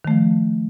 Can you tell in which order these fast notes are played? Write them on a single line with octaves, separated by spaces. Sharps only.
D#3 A3 F3